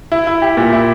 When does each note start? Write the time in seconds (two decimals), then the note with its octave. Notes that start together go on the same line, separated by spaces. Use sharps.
0.12 E4
0.27 E4
0.42 G4
0.57 A#2
0.73 E4